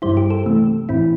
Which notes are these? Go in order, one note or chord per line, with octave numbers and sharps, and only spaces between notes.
G2 G3 E4 C5
G4
A4
C3 E3 A3
A2 E3 C4 E4